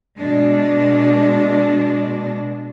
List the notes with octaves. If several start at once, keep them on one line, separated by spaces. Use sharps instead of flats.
B2 G#3 D4